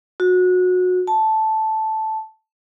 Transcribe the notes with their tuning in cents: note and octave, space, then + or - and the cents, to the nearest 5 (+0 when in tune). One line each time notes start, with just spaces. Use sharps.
F#4 -25
A5 -5